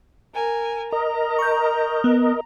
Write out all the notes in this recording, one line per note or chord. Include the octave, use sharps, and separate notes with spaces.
A#4 G#5
A#4 D#5 A#5
C#6 G6
B3